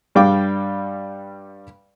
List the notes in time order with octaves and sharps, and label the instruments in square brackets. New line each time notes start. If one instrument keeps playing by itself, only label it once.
[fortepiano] G2 G3 F5 G5 D6